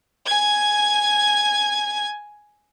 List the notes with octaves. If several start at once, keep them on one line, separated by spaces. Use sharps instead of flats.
G#5 G#6